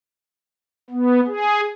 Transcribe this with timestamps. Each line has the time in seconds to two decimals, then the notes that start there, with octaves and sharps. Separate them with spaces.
0.90 B3
1.27 G#4